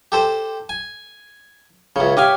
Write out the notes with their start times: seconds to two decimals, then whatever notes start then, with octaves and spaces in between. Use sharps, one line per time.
0.12 G4 A4 C5
0.69 G#5
1.96 C#2 C#3 C#5 E5
2.17 G4 D#5 F5 G5 G#5